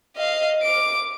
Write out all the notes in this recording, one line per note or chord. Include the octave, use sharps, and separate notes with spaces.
D#5 F5
D6 D7